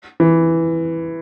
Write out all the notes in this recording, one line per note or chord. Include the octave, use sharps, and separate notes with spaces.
E3